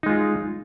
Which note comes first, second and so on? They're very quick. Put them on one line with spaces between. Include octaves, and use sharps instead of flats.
D#4 G#3 F4